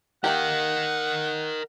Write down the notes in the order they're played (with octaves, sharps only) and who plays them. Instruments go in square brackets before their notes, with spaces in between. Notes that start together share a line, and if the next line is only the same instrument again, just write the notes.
[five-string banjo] A#3 D#4 G4 [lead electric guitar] A#4 D#5 [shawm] F#5